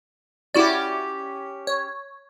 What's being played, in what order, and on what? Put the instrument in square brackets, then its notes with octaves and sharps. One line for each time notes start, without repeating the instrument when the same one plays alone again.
[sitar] C#4 G4 [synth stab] E4 F#4 D5
[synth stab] C#5